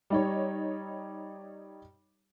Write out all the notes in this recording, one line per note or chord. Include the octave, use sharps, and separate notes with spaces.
G3 D#4 C#5